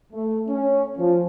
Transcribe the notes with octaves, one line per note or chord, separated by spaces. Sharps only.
A3
C#4
F3